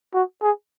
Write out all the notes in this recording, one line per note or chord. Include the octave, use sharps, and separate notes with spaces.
F#4
G#4